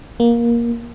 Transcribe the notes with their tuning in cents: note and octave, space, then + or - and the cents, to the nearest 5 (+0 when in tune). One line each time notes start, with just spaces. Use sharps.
A#3 +15